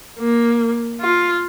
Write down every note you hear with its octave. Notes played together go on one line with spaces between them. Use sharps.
A#3
F4